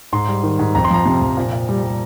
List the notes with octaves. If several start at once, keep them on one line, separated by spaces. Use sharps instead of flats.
G#2 C6
G3
D#3
G#2
F2 A#5
C6
F3 A#5
C3
F2
A#2
A#2
G3
G3